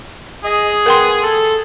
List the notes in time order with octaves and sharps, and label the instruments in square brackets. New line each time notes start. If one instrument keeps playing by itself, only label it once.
[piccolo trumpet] G#4 [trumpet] D#5
[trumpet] B3 [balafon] A#4 G5 C6
[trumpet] A4